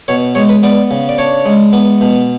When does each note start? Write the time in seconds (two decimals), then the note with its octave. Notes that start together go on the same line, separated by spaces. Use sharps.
0.08 B2 C#5
0.35 G#3 C#5
0.49 B4
0.63 B3 D5
0.91 C#3
1.09 D5
1.18 D4 C#5
1.46 G#3
1.73 B3
2.01 B2